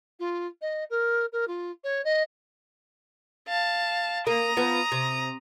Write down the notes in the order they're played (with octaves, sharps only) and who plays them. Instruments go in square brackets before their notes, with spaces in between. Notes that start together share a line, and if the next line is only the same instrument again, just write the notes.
[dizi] F4
D#5
A#4
A#4
F4
C#5
D#5
[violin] F5 A5
[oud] A#3 [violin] A#5 D#6
[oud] F3 B3
C3